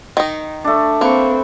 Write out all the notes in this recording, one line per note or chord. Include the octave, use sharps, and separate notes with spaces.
D#3 D#4
A3 D4
A#3 C4 B4 C#6